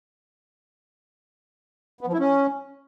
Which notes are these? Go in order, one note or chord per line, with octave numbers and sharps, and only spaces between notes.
B3
F3
E4
C#4